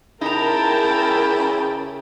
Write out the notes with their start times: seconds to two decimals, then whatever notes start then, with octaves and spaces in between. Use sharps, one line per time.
0.21 C#3 D#4 E4 A#4 G5 A5 A#5